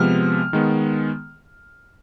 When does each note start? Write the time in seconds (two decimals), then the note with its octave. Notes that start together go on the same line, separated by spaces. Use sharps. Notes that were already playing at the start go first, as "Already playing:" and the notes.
Already playing: C3 F3 G#3 B3 F6
0.53 D#3 G#3 B3